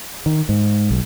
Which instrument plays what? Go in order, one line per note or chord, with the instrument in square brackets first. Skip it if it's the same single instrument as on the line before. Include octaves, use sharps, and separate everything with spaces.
[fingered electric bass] D#3
G#2
B1